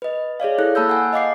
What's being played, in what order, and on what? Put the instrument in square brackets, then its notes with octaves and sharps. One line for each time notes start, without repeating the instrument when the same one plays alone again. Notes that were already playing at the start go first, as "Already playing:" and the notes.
[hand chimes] B4 D#5
G#4 C#5 D5 F5
E4 A4 F#6
A#3 A5 B5 E6 G6
F#5 G#5
D#5 F5 D6 C7